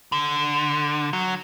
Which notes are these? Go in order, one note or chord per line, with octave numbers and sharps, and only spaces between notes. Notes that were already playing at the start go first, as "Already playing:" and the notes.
D3
F#3